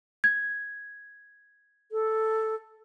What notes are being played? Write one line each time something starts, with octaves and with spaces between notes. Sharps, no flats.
G#6
A4